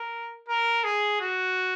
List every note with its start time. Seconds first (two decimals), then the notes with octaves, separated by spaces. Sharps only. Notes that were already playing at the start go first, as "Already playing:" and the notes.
Already playing: A#4
0.49 A#4
0.84 G#4
1.20 F#4